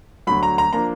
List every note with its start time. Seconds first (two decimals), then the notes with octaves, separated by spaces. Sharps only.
0.27 D2 D3 F#3 B5
0.43 A#5
0.58 A#5
0.73 F3 A#3 D4 A#5